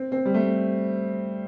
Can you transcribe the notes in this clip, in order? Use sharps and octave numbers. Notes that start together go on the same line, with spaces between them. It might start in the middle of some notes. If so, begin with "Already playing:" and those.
Already playing: C4
C4
G3
A3